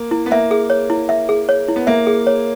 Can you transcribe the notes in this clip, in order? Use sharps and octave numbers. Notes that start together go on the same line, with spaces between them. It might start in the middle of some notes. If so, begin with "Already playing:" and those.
Already playing: A#3
E4
B3
A#3 E5
G#4
C#5
E4
E5
G#4
C#5
E4
B3
A#3 E5
G#4
C#5